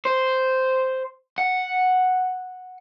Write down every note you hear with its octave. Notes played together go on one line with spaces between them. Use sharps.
C5
F#5